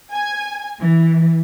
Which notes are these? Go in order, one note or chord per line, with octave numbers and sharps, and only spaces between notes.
G#5
E3